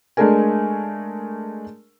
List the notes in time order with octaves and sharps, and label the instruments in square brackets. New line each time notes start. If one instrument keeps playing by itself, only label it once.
[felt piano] G#3 A3 D4 G#4 A#4 G#5